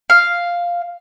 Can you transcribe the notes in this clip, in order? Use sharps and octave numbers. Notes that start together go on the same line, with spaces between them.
F5